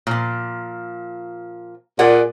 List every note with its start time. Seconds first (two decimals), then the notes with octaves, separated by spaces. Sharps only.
0.07 A#2 F3
1.99 A#2 G#4 D5 F#5